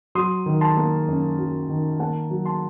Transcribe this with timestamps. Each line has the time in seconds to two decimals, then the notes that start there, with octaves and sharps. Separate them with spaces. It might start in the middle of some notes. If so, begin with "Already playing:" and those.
0.15 F#3 C6 D#6
0.46 D#3
0.61 A5 C6
0.77 A#3
1.08 F#2
1.38 F#3
1.69 D#3
2.00 A#3 F#5 A5
2.30 F#3
2.45 A5 C6